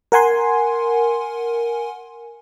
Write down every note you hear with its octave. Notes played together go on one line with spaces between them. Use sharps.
A#4 F#5 G#5 C6